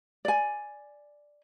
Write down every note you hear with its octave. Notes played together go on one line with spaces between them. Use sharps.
D5 G#5